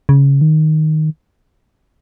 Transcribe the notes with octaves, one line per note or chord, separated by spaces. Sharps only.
C#3
D#3